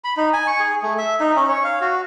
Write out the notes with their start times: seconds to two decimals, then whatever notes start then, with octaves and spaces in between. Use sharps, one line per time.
0.04 B5
0.17 D#4
0.33 G#5
0.47 C#6
0.60 G#4
0.83 A3
0.98 E5
1.20 D#4
1.36 C#4
1.49 C#5
1.64 F5
1.81 F#4